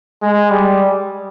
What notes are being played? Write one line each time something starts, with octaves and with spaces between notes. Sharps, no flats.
G#3
G3